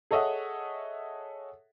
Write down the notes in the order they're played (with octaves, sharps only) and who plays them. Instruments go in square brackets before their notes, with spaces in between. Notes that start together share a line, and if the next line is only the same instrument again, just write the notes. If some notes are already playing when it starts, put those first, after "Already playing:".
[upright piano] G#4 A4 C#5 D#5 E5 F#5